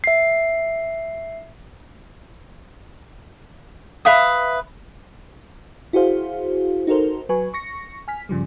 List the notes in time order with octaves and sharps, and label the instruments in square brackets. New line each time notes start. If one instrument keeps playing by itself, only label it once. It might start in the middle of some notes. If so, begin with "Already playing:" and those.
[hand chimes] E5 C7
[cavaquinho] B4 E5 F5 D#6
[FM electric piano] E4 F#4 G#4 C5 F5
D#4 F#4 A4 A#4 C5
F#3 B4 G#5 C#6
C#6 A#6 C#7
G#5 F6 B6
G2 C#3 F3 G3